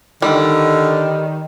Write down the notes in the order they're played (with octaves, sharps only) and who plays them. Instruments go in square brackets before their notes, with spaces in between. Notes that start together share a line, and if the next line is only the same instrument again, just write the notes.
[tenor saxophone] D3 [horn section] D#3 [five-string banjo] G3